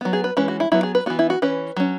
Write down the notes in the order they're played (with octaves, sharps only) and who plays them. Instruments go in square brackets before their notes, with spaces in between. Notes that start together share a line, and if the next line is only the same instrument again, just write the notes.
[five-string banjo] F#3 B3
G#4
B4
E3 G#3 C#4 B4
F#4
E4
F#3 B3 E4
G#4
B4
E3 B3 F#4
E4
F#4
E3 C#4 B4
F#3 C#4